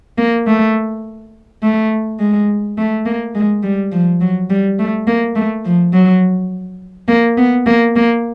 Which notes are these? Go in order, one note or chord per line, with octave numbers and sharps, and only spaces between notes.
A#3
A3
A3
G#3
A3
A#3
G#3
G3
F3
F#3
G3
A3
A#3
A3
F3
F#3
A#3
B3
A#3
A#3